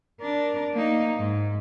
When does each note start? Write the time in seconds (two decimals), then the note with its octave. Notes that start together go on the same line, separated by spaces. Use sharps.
0.21 D4 A#4
0.74 A#3 D#4
1.18 G#2